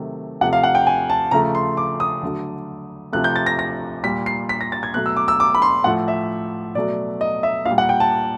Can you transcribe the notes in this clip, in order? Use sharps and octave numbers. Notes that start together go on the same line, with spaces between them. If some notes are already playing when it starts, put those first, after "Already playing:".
Already playing: C3 D#3 F#3 A3
C3 F3 A3 F#5
F5
F#5
G5
G#5
A5
C#3 F3 A3 A#5
C6
D6
D#6
D3 F#3 A3
C3 F3 A3 F#6
G6
A6
A#6
A#6
A#2 G3 B6
C7
B6
A#6
A6
G#6
B2 F#3 A3 F#6
E6
D6
E6
D6
B5
C6
A2 F3 A3 F#5
E5
B2 F#3 A3 D5
D#5
E5
A#2 G3 F5
F#5
G5
A5